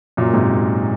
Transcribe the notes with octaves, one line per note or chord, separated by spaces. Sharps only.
F#2 A#2
G#2 C3